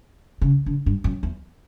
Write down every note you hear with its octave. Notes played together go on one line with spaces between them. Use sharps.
C#3
D3
G2
F#2
E2